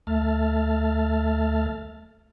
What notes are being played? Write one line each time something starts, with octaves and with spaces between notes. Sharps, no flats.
D2 A3 E5 A5 F6 A6